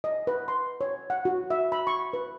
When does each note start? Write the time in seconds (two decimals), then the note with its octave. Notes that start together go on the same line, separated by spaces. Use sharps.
0.04 D#5
0.27 B4
0.48 C6
0.81 C#5
1.10 F#5
1.25 F#4
1.50 E5
1.72 B5
1.87 C#6
2.13 B4